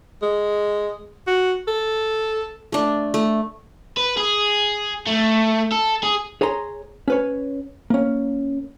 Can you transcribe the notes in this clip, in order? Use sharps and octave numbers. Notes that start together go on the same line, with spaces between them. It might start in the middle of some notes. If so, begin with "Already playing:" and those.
G#3
F#4
A4
A3 D4
A3
B4
G#4
A3
A4
G#4
G#4 C#5 G#5 A#5 C6
C#4 B4 C#5
A#3 C#4